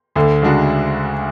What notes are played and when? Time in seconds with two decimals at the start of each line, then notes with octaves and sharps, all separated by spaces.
0.16 D2 D3
0.42 C#3 G#3 D4 F#4